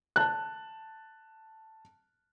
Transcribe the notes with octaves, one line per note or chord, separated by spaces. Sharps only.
A5 F#6